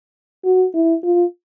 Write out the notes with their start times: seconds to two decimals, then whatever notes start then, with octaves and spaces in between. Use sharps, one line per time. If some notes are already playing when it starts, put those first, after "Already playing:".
0.45 F#4
0.74 E4
1.04 F4